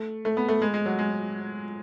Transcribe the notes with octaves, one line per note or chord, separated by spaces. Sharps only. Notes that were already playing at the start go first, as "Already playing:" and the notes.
Already playing: A3
A3
B3
A3
G#3
G#3
F#3
G#3